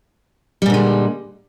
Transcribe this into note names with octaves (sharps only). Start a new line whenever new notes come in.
A#2 D3 G3 G#3